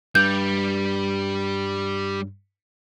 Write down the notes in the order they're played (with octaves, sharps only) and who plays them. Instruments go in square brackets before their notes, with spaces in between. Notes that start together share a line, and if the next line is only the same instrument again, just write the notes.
[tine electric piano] G2 [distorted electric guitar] G3 [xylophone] G6